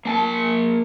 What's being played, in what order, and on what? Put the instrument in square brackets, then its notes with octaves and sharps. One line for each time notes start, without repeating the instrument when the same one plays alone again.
[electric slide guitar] A#3 G#5 A5